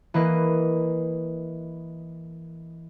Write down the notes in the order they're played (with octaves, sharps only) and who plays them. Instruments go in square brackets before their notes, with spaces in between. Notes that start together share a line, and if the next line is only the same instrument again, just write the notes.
[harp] E3 A#3 B4 D#5